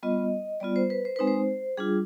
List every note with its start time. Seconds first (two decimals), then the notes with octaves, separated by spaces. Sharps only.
0.03 G3 B3 F4 D#5
0.60 G3 B3 F4 D5
0.76 C5
0.90 B4
1.05 C5
1.16 G#3 C4 D#4 B4
1.27 C5
1.77 G3 D4 F4 G#4